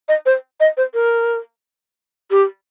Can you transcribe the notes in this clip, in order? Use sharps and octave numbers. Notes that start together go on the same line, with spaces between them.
D#5
C5
D#5
C5
A#4
G4